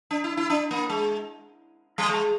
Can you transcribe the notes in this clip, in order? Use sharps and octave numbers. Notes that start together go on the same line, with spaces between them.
D4
E4
E4
D4
A#3
G#3
G3
G#3